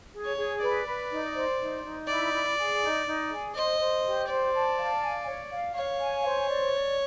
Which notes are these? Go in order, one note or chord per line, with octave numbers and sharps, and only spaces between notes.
G#4
C#5
G#4
B4 D5
B4
D#4
C5
D#4
D#4
E4 D5
E4
G#4
D#4
D#4
G#4
C5 D#5
C5
G4
C5 D5
A5
F5
G#5
C#5
F5
C#5 F5
G#5
C5
D5
D5